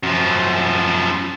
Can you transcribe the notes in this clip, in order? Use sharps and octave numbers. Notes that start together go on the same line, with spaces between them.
F#2 F3